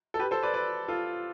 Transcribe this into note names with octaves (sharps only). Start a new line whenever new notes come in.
A4
G4 B4
A4 C5
B4 D5
B4 D5
F4 A4